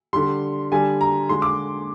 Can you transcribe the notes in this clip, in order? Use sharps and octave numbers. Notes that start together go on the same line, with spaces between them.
D3 G3 C6
D3 G3 G#5
A#5
D3 G#3 C6
D6